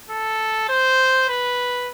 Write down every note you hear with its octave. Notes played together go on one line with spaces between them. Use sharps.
A4
C5
B4